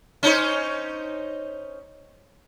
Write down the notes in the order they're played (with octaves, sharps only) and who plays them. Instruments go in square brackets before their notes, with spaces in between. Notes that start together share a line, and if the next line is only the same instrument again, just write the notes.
[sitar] C#4 D#4 C5